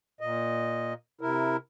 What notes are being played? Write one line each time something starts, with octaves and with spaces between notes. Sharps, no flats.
A#2 D#5
C3 E4 A#4